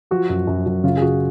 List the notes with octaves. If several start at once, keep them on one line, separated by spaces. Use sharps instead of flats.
F3 F#4
F#2
F#2
F#2
C#3 F4
G#4
C#3 F#4